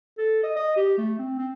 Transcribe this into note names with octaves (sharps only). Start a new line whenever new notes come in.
A4
D#5
D#5
G4
A3
C4
C4